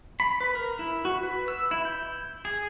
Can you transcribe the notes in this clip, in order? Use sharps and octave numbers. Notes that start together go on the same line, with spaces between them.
B5
B4
A#4
E4
F#4
B4
E6
E4
G6
G#4